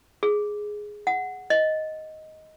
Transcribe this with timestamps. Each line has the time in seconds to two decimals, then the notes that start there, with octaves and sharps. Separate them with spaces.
0.23 G#4
1.07 F#5
1.50 D#5